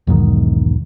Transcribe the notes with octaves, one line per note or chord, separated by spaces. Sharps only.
B1 E2 G#2 D#3